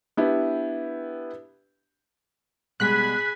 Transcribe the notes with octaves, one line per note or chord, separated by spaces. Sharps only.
B3 D4 E4 G4
B2 G3 G#3 G#4 G#5 B5 F#6 B6